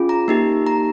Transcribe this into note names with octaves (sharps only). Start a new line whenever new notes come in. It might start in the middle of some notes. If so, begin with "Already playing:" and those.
Already playing: C#4 F4 G#4
A#5
A#3 D#4 G4
A#5